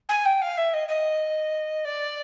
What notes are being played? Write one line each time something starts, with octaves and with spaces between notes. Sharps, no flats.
G#5
G5
F5
E5
D#5
D#5
D5